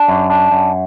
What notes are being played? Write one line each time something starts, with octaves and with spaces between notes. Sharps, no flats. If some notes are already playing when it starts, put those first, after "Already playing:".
Already playing: D4
F#2
D4
F#2